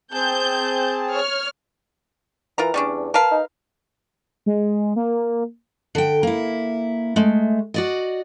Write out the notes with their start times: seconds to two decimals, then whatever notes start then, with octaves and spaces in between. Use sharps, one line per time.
0.12 C4 G#4 A5 G6
1.10 C#5 F6
2.58 E3 F4 A#4 A#5
2.74 E2 G3 C#4 D4
3.14 A#4 B4 F5 A5
3.31 D#4
4.46 G#3
4.96 A#3
5.95 D3 G5
6.23 A#3 E4
7.16 G#3 A3
7.74 F#4 D5 D#5